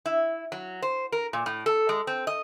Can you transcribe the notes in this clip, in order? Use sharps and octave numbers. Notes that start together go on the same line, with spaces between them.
E4
F#3
C5
A#4
A#2
A2
A4
G#3
C4
D#5